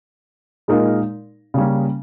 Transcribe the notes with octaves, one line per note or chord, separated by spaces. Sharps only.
A#2 G#3 D#4 A#4 F5
C#3 G3 A#3 C#4